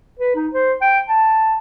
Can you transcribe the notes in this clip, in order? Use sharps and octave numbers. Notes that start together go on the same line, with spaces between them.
B4
D#4
C5
G5
A5